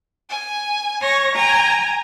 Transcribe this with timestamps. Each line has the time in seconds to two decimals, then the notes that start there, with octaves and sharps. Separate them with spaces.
0.29 G#5
1.03 C#5 C#6 A#6
1.34 G5 G#5 A#5